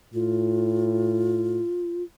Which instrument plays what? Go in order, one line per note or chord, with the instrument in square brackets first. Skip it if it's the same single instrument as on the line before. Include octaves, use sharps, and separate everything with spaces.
[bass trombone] A2 [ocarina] F4